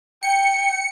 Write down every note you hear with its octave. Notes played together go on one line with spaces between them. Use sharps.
G5 C#7